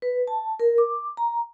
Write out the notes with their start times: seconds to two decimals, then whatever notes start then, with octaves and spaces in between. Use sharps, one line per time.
0.02 B4
0.28 A5
0.60 A#4
0.78 D6
1.17 A#5